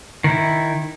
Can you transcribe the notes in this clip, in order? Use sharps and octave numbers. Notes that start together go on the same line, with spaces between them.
D#3 E4